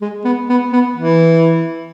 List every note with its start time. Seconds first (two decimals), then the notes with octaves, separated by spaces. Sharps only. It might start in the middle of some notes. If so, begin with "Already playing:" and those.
0.02 G#3
0.25 B3
0.49 B3
0.73 B3
0.96 E3